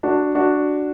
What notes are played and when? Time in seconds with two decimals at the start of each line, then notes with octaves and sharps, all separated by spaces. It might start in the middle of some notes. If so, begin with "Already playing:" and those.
0.03 D4 F#4
0.35 D4 F#4